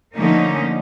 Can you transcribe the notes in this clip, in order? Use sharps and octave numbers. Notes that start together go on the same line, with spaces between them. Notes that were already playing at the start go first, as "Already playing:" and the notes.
D3 F3 A3 A#3 C#4 D#4